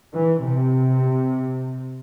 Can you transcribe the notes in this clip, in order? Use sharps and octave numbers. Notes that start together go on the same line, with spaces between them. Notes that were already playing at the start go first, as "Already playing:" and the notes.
E3
C3